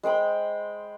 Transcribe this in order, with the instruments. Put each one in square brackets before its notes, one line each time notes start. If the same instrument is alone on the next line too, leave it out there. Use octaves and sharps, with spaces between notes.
[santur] G#3 C5 G5 B5